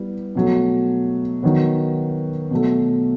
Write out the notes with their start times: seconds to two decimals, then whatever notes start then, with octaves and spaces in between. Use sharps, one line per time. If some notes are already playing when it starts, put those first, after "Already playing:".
Already playing: G3 B3 E4
0.35 B2 F#3 A3
1.43 D#3 F#3 B3
2.51 B2 F#3 A3